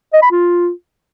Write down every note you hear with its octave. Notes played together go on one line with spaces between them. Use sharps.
D#5
B5
F4